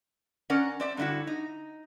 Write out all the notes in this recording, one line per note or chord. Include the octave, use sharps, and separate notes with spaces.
C#4 A#4 D5 F#5
C4 D5 E5
G2 D3 D#4 E4 F#4
D#4